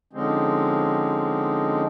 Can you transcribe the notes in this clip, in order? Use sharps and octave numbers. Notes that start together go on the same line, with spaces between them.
D3 F3 G#3 C4 C#4 D#4